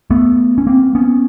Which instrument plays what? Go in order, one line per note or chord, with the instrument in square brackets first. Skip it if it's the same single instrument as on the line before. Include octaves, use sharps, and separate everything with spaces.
[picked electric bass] A3 B3
C#4
A#3 C4
B3 C#4